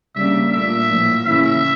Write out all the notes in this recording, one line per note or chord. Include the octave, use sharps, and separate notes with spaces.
C#3 G3 A#3 D4 E5
A#2 A3 D4 E5
A2 F3 A#3
C#3 E3 A#3 C#4 E4 E5